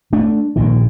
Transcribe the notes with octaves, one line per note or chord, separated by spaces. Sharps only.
A3 D4
A#1 A#2 D#3